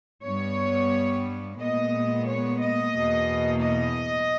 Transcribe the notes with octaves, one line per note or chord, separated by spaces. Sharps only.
G2 G3 B3 C#5
A#2 G#3 B3 D#5
C#5
D#5
E2 B2 A#3
D#5